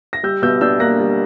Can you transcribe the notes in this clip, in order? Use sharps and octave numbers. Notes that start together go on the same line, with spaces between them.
A#6
G3 E6 G6
B2 E6 G6
D4 E6 G6
A#3 F#6 A#6
G3